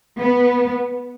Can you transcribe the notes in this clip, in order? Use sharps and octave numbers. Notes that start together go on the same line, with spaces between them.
B3